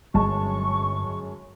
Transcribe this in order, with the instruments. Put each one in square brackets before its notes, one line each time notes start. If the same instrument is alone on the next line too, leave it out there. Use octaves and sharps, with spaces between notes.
[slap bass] G1 [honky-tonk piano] F#2 G#3 A5 [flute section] C#6